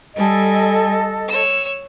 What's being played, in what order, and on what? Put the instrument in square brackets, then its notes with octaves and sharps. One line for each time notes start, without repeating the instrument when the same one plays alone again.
[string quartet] G3 G#5 [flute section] A4 D#5
[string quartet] C#5 E6